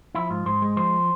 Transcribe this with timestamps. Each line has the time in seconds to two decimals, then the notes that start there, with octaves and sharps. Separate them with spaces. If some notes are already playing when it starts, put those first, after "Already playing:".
0.15 F3 E4
0.30 G#2 F4
0.46 G#2 C5
0.62 G#3
0.76 F3 C5